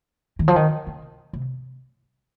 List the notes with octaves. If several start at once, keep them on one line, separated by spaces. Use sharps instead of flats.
D#3
F3
D#3
C#3
C3